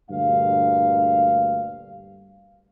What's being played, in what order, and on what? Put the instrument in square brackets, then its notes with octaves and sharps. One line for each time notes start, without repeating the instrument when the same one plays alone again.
[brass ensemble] D2 G2 A#2 F5